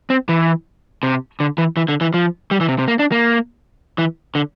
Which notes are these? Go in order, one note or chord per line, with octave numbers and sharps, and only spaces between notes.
C4
E3
C3
D3
E3
E3
D3
E3
F3
G3
E3
C3
C3
A#3
D4
A#3
E3
D3